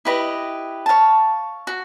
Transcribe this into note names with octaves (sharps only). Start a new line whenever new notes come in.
E4 G4 B4 D#5
C#5 F5 A5
F#4